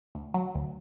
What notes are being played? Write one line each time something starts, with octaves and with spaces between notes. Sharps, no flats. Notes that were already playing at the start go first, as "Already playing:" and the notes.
D2
F#3
D2